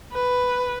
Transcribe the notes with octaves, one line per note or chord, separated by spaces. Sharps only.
B4